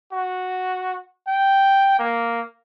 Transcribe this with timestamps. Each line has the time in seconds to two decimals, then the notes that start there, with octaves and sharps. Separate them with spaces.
0.12 F#4
1.28 G5
1.99 A#3